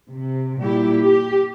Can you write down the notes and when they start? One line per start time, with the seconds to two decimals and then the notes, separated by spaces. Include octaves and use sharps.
0.11 C3
0.62 A#2 G3 E4 G4
1.04 G4